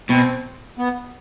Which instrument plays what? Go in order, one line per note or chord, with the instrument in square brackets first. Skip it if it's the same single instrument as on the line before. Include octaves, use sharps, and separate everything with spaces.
[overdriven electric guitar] B2 [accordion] C4
[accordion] B3